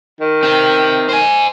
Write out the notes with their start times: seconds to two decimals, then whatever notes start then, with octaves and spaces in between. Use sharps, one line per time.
0.20 D#3
0.43 C4 G4
1.09 C5 G#5